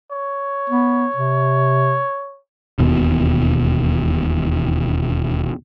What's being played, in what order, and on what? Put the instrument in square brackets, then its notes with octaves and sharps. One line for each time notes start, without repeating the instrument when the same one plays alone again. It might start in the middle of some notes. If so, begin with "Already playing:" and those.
[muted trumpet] C#5
[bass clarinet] B3
C3
[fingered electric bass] E1 D#2 B2